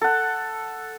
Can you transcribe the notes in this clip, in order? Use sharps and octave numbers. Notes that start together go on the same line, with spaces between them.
A4 F#5